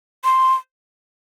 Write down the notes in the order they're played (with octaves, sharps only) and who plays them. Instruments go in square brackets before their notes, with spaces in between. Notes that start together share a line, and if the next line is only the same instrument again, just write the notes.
[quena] C6